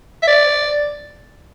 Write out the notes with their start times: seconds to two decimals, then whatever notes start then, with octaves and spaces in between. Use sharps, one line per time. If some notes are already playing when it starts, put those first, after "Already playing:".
0.23 E5
0.27 D5